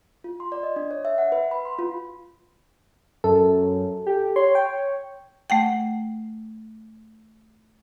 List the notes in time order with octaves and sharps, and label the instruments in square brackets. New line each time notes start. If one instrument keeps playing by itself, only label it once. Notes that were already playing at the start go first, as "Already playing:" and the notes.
[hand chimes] F4
C6
D5
D#5
D4
C#5
E5
F#5
B4
B5
C6
F4
[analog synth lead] F#2 [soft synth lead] A4
[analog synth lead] G4
[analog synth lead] C#5 [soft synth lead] C6
[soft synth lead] G5
[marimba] A3 F#5 G5